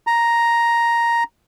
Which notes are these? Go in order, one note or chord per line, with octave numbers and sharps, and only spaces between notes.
A#5